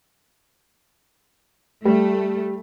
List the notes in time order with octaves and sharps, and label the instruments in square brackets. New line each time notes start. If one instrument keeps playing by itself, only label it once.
[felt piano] G3 [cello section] A3